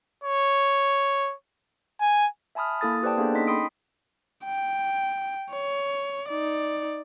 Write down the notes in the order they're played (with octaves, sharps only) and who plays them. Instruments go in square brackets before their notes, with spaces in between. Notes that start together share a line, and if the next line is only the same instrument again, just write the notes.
[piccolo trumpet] C#5
G#5
[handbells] E5 G#5 A5 B5 D#6 F6
A#3 E4 A4 D#6 A6
G4 B4 C5 D5 G5 A5
A#3 B3 D4 G#4 A4
C#4 D#4 D#5 C6 B6
G5 B5 C6 D#6 D7
[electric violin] G5
C#5
D#4 D5